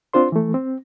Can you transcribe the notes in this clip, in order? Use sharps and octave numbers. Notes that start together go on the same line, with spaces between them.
C4 D4 F4 C5 C6
E3 A3
C4